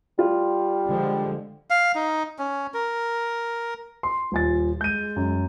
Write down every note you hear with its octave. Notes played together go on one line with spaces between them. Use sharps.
G3 F4
D3 F3 G#3
F5
D#4
C#4
A#4
C6
D#1 F4 G#5 A6
G#3 G6 D#7
F#2